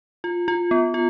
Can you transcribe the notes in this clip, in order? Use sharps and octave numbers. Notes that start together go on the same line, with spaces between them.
F4
F4
B3
F4